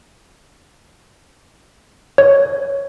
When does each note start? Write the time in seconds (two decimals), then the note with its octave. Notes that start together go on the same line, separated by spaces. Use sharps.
2.18 C#5